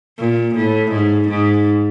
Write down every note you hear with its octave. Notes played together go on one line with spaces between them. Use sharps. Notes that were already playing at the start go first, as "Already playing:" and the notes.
A#2
A2
G#2
G#2